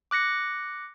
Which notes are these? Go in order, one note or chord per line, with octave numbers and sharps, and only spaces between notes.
D6 F#6 A#6 C#7